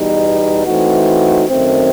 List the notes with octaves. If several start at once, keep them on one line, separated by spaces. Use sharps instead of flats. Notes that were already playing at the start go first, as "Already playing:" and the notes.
Already playing: E2 B2 G3 D#4
E3 A3 C4 D#4 F#4
F#2 D#3 A3 C4